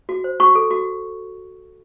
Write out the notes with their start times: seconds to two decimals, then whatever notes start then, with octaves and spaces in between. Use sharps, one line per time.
0.09 F#4
0.24 C5
0.40 F#4 C#6
0.55 A4
0.71 F#4